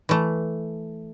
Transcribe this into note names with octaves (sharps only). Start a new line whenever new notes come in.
E3 A3